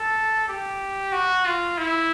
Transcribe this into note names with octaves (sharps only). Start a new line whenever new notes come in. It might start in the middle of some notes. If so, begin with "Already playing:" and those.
Already playing: A4
G4
F#4
F4
E4